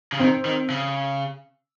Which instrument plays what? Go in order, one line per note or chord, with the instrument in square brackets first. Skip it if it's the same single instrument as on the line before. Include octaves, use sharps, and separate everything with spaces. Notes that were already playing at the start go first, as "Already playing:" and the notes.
[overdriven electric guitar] C#3
[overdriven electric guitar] D#3 [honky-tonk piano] C4
[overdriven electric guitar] D#3
C#3